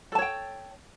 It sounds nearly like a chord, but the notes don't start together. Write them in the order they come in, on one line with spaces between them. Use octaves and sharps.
A4 A5 C#5 G5